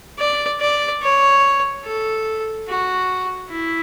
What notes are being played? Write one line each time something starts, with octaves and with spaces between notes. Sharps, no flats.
D5
D5
C#5
A4
F#4
E4